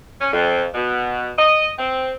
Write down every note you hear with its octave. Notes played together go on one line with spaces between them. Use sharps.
C#4
F2
B2
D#5
C4